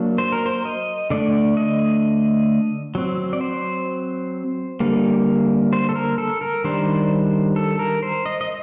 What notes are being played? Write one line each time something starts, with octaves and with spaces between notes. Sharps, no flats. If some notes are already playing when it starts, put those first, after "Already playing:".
Already playing: F#3 A#3 D4
C5
A#4
C5
D#5
D3 A3 D4 D5
D#5
F#3 C4
D5
C5
D3 G3 A#3
C5
A4
A#4
A4
A#4
D#3 G3 D4 C5
A4
A#4
C5
D#5
D#5